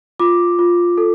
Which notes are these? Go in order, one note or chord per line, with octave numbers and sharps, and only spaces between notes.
F4 D6
F4
A4